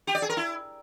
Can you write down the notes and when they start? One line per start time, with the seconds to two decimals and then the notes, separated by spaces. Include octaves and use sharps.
0.07 G4
0.15 D5
0.22 G#4
0.29 A#4
0.37 E4